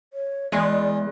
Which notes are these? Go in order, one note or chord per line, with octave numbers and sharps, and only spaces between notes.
C#5
E2 E3 G#3 D5